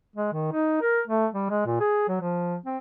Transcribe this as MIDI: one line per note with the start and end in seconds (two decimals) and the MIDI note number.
0.16 0.30 56
0.33 0.48 51
0.53 0.78 63
0.82 1.01 70
1.08 1.26 57
1.34 1.46 55
1.50 1.62 56
1.66 1.77 46
1.80 2.07 68
2.09 2.16 54
2.21 2.56 53
2.66 2.78 60